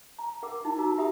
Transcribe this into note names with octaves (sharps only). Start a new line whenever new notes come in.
A#5
A#4 F#5 D6
D#4 E4 B5
F#4 A#5 E6
G4 E5 F#5 B5 D#6